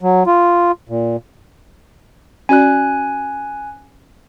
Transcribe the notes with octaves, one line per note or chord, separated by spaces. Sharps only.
F#3
F4
A#2
C#4 F#4 D5 G#5 F#6